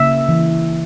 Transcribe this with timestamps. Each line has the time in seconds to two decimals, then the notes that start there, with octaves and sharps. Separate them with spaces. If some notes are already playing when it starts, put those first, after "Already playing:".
Already playing: C#3 A#3 E5
0.29 E3